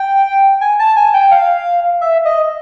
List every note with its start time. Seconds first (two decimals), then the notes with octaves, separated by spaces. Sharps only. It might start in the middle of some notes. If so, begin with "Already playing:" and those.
Already playing: G5
0.61 G#5
0.79 A5
0.96 G#5
1.14 G5
1.31 F5
2.01 E5
2.25 D#5